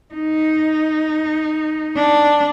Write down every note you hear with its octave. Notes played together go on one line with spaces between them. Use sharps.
D#4
D4